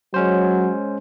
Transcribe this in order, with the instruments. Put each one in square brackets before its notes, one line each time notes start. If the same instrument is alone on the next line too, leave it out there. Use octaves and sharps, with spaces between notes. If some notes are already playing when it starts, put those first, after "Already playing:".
[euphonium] F#3 [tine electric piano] G#3 C#4 C5